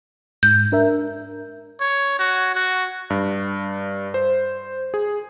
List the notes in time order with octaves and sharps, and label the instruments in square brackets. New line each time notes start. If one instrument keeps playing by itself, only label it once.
[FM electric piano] G#2 [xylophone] G6
[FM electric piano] D4 A#4 E5
[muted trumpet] C#5
F#4
F#4
[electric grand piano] G2
C5
G#4